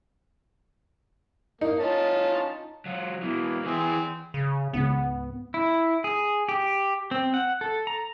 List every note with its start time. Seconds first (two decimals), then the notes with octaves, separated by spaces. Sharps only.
1.61 A#3 D#4
1.79 C#4 F4 A5
2.86 F#3 F4
3.23 B2 E3 A#3
3.66 E3 C4 G#4
4.34 C#3
4.73 C#2 G#2 C#3 B3
5.54 E4
6.04 G#4
6.49 G4
7.11 C4
7.34 F#5
7.61 A4
7.87 A#5